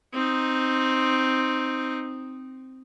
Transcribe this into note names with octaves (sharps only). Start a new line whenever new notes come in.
C4 D#4